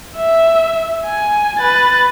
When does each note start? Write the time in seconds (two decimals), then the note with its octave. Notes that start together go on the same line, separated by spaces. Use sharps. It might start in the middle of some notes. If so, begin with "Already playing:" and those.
0.17 E5
1.05 G#5
1.58 B4 A6